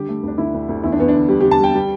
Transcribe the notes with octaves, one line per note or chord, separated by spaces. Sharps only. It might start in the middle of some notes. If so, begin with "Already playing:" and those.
Already playing: D3 G3 G4
A3
D2 D4
D2 E4
D2
D2
E2 E4
D4
E2 B3
D4
D3
G3 G4
G4
D3
A5
G3 G5
G3